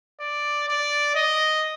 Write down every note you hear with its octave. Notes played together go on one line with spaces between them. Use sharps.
D5
D5
D#5